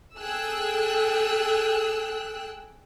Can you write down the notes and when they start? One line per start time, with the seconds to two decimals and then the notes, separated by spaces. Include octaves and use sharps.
0.19 G#4 A4 G5 E6 F#6